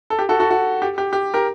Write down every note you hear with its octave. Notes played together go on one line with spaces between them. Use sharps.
A4
G4
F#4 A4
F#4 A4
F#4
G4
G4
G4
G4 A#4